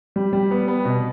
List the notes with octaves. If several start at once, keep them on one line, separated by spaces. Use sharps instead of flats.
G3
G3
B3
B3
B2